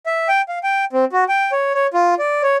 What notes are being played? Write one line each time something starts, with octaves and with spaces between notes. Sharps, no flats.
E5
G5
F5
G5
C4
F#4
G5
C#5
C#5
F4
D5
C#5